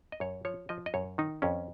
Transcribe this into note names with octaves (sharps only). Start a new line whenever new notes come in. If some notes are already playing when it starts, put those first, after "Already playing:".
D#5
F#2 C#5
F3 C#5
F3 D#5
D#5
F#2 C#5
D#3 D#4
F2 C#4